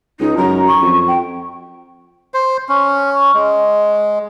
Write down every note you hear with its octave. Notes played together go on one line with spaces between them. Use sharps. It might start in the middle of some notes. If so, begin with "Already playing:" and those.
C#2 D#4
F#2 A#5
C#6
F2
G5
C5
C#4
G#3